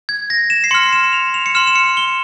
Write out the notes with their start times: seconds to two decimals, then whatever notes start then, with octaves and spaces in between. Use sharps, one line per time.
0.09 G#6
0.30 A#6
0.50 E7
0.64 C7
0.71 C6 F6 C#7
0.93 E7
1.13 F7
1.34 F7
1.46 C#7
1.55 C6 F6 E7
1.67 E7
1.76 C#7
1.97 G7